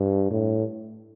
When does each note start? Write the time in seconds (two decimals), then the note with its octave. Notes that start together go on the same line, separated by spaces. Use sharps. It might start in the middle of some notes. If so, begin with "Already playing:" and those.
Already playing: G2
0.31 A2